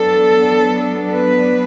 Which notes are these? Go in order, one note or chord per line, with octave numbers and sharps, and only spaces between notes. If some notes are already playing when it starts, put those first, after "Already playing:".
Already playing: F#3 B3 D4 A4
B4